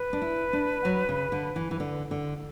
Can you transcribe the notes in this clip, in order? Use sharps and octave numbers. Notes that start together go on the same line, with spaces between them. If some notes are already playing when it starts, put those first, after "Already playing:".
Already playing: B4
D4
E4
D4
F#3
C#3
D3
E3
E3
D3
D3